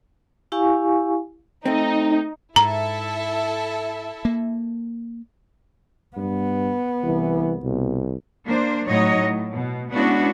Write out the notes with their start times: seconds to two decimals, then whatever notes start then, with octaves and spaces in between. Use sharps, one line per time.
0.52 E4 G4 F5 G#5 C#6
1.65 A3 C4 D#4
2.56 G#2 E4 A4 E5 A#5
4.25 A#3
6.17 G2 B3
7.04 C2 E3
7.63 C2 B2
8.46 A#3 D4 C5
8.87 A2 F#3 D#4 C#5 D#5
9.17 A2
9.53 B2
9.92 G#3 B3 C#4 D4 E4 F#4